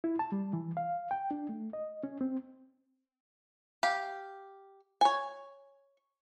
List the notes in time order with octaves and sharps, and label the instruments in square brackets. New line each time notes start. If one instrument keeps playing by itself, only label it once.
[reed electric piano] E4
A5
G3
E3
F5
G5
D4
A3
D#5
C#4
C4
[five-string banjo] G4 F5
C#5 G#5